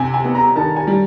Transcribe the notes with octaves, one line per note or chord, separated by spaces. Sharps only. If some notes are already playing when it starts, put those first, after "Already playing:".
Already playing: C3 G#5
G#5
B3
A#5
D#3 A5
G#5
G3